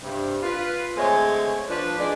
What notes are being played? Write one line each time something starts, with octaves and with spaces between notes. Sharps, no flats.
G2 C3
F4 B4
D3 G#3 A3 C4 G#4 C#5
F3 D4 B4
G#3 D4